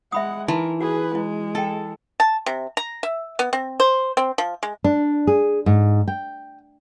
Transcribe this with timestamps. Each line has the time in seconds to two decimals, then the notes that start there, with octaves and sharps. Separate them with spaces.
0.12 G#3 E5 F#5 B5 D#6
0.48 E3 D#4 A#4 A5 C6
0.81 F#4 G#4 B4
1.15 G#3 E4
1.55 A4 G5 A5
2.20 A5
2.46 C3
2.77 A#5
3.03 E5
3.39 B3
3.53 C4
3.80 C5
4.17 C4
4.38 F3
4.63 G#3
4.84 D4
5.27 G#4
5.66 G#2
6.08 G5